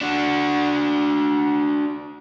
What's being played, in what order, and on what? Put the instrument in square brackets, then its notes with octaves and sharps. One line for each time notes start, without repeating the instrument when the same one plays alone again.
[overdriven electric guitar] D4 F#4